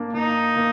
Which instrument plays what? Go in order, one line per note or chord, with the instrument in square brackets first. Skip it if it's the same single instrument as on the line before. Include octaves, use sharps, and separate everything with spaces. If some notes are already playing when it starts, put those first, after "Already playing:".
Already playing: [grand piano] A#3 D4
[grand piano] A#3 [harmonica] D#4
[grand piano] A#3